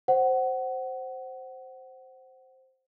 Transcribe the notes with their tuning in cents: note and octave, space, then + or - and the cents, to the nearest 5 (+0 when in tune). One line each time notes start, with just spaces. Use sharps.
C5 +0 F#5 +20